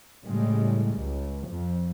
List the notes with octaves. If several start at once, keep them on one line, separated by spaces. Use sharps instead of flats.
A2 C#3 G3 G#3
C#2
F2